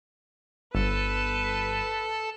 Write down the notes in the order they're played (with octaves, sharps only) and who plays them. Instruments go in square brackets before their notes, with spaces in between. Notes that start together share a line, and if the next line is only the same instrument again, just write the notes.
[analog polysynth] G1 [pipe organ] A4 A5 [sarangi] B4